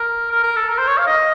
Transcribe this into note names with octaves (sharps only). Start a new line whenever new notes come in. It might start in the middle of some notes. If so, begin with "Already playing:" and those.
Already playing: A#4
A#4
A#4
A4
A#4
C5
C#5
F5
D#5